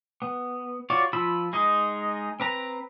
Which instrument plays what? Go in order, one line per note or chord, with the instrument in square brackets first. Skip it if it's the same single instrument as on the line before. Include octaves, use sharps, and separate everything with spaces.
[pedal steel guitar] B3
F4 F#4 C#5 D5
F3 F4 B5 E6
G#3 D#4 D#5
C4 B4 A#5